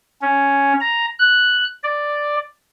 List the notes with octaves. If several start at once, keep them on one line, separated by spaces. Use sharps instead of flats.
C#4
A#5
F#6
D5